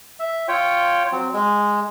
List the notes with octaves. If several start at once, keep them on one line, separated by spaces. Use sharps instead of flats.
E5
F4 C#5 G5
F#3 C4
G#3